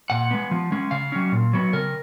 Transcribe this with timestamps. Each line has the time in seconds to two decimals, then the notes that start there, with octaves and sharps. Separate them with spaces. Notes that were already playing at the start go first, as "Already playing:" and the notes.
0.10 A#2 F#5
0.31 G#3 B3
0.51 F3
0.72 G#3 C#4
0.91 C#3 F5
1.12 F#3 C#4
1.32 A#2
1.53 F#3 B3
1.73 C#3 A#4